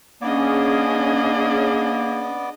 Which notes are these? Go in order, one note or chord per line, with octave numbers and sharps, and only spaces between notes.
A#3 B3 C#4 D4 G#4 D5 D#5 D6